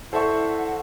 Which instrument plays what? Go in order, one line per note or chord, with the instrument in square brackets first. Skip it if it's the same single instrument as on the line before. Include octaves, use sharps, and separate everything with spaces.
[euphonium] E4 [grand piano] A4 D5 [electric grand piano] C5 E5 C#6 [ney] F#5